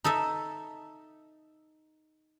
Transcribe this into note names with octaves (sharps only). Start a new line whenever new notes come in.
D#4 A4 D#5 E5